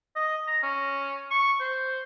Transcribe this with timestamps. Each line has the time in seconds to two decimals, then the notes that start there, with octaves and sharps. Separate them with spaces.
0.16 D#5
0.47 A#5
0.63 C#4
1.31 C#6
1.60 C5